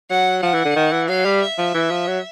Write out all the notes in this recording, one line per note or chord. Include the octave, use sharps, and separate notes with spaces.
F#3 F#5
F3 F#5
E3
D3
D#3
E3
F#3 F5
G3
E5
F3
E3
F3
F#3